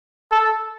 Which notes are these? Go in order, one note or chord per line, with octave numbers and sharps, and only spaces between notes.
A4